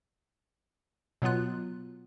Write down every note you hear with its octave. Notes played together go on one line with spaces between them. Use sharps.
B2 F#3 B3 F4 F#6